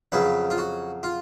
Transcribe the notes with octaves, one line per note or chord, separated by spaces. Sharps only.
F2 C#3 F#3 B4
F4
F#4
F4